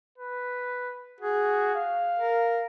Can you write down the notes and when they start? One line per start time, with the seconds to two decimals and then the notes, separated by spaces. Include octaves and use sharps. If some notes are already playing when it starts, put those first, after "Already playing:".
0.18 B4
1.20 F#4 G#4
1.75 F5
2.19 A#4